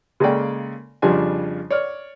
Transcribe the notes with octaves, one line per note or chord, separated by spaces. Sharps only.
C#3 G#3 A#3 A4 D5 G5
F2 C#3 F3 G3 D4 G#5
C#5 D5 F6